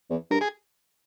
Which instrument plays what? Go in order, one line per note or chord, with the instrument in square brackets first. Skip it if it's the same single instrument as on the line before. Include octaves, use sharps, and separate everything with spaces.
[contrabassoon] E2
[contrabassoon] G2 [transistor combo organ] A#4
[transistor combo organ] G#4